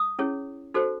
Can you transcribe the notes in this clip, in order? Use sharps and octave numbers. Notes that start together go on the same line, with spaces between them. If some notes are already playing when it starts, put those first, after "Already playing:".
Already playing: D#6
C#4 E4 G#4 C#5
D#4 F#4 A4 C5